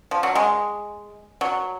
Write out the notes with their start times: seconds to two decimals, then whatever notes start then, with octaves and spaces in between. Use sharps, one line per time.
0.11 F3
0.23 F#3
0.35 G#3
1.41 F#3